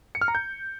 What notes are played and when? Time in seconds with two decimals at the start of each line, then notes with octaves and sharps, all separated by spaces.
0.15 C#7
0.21 F6
0.28 A#5
0.35 G6